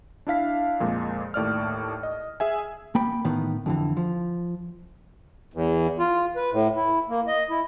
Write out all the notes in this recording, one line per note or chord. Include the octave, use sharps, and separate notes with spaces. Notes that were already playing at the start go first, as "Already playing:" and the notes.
D4 E4 F5 B6
F2 A#2 G#3
D#2 A2 D5 F6
D#5
G#4 E5 G#5
A#3 G5 B5
A2 D#3 E3 B3
F2 D3 E3
F3
E2
F4
B4
A2
E4
A#3
D#5
E4